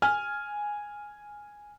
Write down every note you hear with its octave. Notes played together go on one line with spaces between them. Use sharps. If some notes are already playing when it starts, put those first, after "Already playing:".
G#5 F6